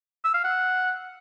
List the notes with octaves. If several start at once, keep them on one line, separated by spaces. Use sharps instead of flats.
E6
F5
F#5